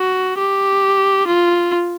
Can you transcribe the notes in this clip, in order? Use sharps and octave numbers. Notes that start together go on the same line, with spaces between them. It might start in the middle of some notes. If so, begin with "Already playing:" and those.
Already playing: F#4
G4
F4